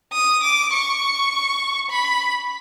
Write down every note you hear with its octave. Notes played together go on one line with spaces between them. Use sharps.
D#6
D6
C#6
B5